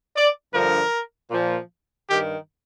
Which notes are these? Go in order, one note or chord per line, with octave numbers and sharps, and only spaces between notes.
D5
G2 D3 F3 A#4
A#2 F3
G2 D#3 G4